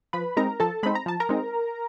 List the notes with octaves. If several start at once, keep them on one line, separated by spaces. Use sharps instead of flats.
F3 B4 B5
G#3 C4 D#4 A#4 A#5
F3 A4 A5
G#3 C4 D#4 B5
A#5
F3 A5
A#4 A#5
G#3 C4 D#4